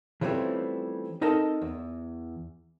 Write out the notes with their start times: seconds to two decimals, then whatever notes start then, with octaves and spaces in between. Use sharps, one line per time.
0.21 E3 F3 G3 A3 C4 C#4
1.21 C4 D#4 A4 A#4 D#5 A5
1.62 E2